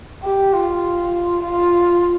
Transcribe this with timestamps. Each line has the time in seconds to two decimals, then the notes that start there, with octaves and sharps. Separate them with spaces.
0.23 G4
0.53 F4
1.43 F4